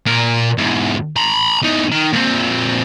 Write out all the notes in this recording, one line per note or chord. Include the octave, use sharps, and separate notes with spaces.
A#2 A#4
E2 G#2
A#5 B5
E2 D#4
D#3
A#2 C4